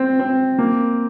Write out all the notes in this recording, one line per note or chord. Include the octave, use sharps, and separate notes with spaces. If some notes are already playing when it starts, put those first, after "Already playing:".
Already playing: C4
C4
A#3